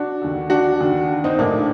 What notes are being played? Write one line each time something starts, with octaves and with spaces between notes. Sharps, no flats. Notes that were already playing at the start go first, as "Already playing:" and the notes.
Already playing: D4 F#4
D#2 D3
D4 F#4
D#2 D3
C4 D#4
A#1 A2 A#3 D4